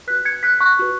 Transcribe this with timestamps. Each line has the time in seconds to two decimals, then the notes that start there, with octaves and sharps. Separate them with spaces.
0.07 F#4 B4 F#6 B6
0.25 G#6 C#7
0.43 F#6 B6
0.60 C#6 F#6
0.79 F#4 B4